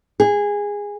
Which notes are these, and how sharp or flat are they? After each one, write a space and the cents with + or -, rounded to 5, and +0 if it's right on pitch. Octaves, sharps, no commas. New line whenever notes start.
G#4 -15